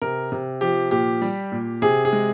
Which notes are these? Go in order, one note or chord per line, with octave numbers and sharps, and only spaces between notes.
C3 A#4
C3
F3 G4
A#2 G4
G3
A#2
C3 G#4
G#4
G#3